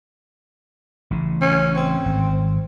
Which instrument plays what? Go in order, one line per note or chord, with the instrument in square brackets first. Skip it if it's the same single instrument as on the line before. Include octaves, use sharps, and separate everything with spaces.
[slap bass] A1 C#3
[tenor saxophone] C#4
C4
[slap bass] G#1